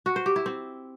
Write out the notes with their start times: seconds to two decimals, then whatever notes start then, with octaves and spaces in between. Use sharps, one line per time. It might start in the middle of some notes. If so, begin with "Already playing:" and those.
0.06 F#4
0.16 C5
0.26 G4
0.36 E4
0.46 C4